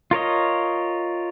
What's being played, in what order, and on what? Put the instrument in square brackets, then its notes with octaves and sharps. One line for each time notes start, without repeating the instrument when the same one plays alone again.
[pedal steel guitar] F4 A#4 C#5 D#5